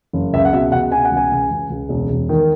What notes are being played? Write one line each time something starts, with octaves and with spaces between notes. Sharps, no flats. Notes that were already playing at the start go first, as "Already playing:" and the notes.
F#1
C#2 E5
F#5
B2 E5
C#2 F#5
B2 G#5
F#5
C#2
G#5
C#2
C#2
C#2
E1
E1
D#3